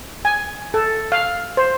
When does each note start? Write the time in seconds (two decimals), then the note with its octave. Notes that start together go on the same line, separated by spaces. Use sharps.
0.25 G#5
0.74 A4
1.12 F5
1.57 C5